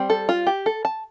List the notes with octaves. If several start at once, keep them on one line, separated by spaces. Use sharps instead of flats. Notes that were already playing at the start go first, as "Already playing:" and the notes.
Already playing: G3 C4
A4
F4
G4
A4
A5